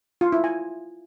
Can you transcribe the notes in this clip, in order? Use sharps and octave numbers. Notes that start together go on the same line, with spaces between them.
F4
E4
G#5